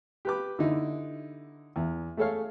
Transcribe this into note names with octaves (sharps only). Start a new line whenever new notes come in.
G4 B4 D6
D3 D#4 E4
E2
A3 G#4 A4 C#5 F5